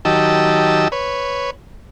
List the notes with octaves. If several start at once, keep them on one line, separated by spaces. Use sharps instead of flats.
D#3 F#3 G4 D#5 A5 E6
B4 C#5